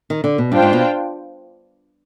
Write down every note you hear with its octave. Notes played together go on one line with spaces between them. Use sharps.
D#3
D3
B2
G2 D4 F4 C5 G5
G#2
B2